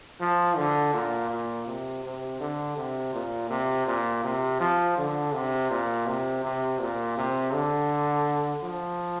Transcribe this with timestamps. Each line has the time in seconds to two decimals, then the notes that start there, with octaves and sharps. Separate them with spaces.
0.21 F3
0.57 D3
0.93 A#2
1.30 A#2
1.67 C3
2.03 C3
2.40 D3
2.77 C3
3.13 A#2
3.50 C3
3.87 A#2
4.24 C3
4.60 F3
4.98 D3
5.34 C3
5.70 A#2
6.07 C3
6.44 C3
6.80 A#2
7.17 C3
7.54 D3
8.64 F3